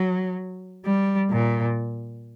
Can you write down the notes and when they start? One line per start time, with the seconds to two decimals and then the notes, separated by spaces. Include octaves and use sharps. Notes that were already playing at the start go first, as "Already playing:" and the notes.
Already playing: F#3
0.86 G3
1.31 A#2